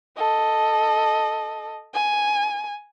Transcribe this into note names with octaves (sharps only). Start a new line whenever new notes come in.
A4 D#5
G#5